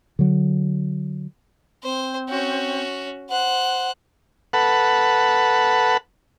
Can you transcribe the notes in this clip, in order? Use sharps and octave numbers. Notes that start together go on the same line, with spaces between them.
D3 F#3
C4 C5
C#4 F#4
C5 F#5 F#6
A4 B4 F#5